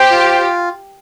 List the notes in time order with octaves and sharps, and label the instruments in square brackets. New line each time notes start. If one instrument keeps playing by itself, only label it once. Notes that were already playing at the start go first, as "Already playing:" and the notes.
Already playing: [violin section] G4 [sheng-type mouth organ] C5
[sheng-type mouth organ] F4